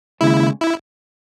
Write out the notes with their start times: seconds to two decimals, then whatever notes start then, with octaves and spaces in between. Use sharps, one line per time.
0.21 D#2 C#3 G#3 E4
0.61 E4